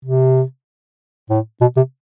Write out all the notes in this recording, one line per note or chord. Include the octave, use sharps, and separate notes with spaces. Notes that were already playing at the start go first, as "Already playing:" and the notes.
C3
A2
B2
C3